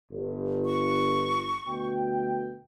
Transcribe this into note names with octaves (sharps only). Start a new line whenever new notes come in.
G1
C#6
D2 B2 G5